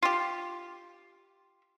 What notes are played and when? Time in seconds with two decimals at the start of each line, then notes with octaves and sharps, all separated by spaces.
0.03 F4 G4